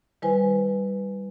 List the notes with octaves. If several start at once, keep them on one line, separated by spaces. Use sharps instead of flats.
D#3 G3 E4 B4 C5 G#5